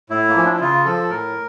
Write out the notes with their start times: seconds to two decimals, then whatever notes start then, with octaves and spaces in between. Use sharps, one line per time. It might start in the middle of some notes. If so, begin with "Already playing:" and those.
0.10 A2 E4
0.29 A#3
0.35 F3 C#4
0.45 D4
0.53 E4
0.61 C#3 F4
0.85 F3 A4
1.10 A2 A#4